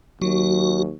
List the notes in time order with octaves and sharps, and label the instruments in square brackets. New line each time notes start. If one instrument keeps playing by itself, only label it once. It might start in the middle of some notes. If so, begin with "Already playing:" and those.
[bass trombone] D#2 [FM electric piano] F#3 [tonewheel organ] F#4